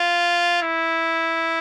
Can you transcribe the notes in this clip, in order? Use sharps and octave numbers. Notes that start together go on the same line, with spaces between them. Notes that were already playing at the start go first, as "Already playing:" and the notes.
Already playing: F4
E4